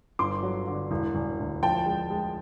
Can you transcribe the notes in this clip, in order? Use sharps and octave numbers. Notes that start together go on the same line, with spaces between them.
G1 C6 D6
F#3
D3
E1
E1
D2
F3 G5 A5
G#3
G#3